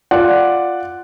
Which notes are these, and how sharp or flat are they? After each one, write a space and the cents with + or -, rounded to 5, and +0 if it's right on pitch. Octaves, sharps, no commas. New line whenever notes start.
F4 +0 D5 +0 F#5 +0